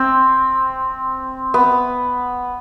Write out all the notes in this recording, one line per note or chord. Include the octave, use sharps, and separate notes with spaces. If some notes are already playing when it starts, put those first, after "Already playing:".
Already playing: C4
B3